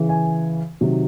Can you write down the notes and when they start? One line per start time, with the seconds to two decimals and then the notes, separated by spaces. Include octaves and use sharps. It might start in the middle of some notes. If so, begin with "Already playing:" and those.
Already playing: C#3 E3
0.09 G#5
0.81 C3 D#3 F#3